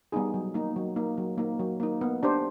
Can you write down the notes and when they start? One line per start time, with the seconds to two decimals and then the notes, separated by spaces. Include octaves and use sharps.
0.12 G3 B3 D#4 G#4
0.34 F#3
0.54 A#3 D#4
0.76 F#3
0.96 A#3 D#4
1.18 F#3
1.38 A#3 D#4
1.59 F#3
1.80 A#3 D#4
2.01 B3
2.23 D4 G4 C5